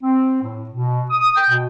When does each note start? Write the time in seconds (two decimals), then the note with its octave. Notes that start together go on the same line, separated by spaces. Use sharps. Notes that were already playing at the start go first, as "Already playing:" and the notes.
0.03 C4
0.42 A2
0.70 B2
1.10 D#6
1.36 G5
1.50 B2